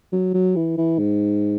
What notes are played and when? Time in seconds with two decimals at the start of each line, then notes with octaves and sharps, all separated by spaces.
0.13 F#3
0.34 F#3
0.56 E3
0.78 E3
0.99 G#2